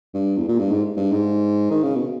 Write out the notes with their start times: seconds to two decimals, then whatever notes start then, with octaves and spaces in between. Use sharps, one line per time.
0.14 G2
0.37 E2
0.48 A#2
0.59 G2
0.71 G#2
0.97 G2
1.12 G#2
1.71 D#3
1.83 C#3
1.96 B2